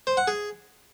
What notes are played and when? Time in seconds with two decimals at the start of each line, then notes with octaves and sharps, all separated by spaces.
0.07 C5
0.17 F#5
0.28 G#4